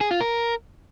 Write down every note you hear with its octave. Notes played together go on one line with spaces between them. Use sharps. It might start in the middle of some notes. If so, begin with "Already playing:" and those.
G#4
F4
A#4